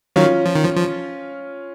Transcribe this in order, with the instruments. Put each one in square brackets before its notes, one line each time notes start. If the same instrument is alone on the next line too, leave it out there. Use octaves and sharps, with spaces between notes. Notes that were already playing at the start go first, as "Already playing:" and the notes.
[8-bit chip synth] D#3 F#3 [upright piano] C#4 F4
[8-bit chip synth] F3
D#3
F3
F3